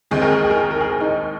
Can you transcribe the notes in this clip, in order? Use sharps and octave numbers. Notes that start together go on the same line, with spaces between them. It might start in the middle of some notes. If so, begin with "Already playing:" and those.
D#2 D#3 G#3 C4 G#4
A#4
G#4
G#4
A#4
A#4
G#4
A#4
D#4